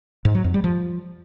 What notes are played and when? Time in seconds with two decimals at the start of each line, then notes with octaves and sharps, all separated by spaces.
0.25 G#2
0.35 F#3
0.44 F2
0.54 G3
0.64 F3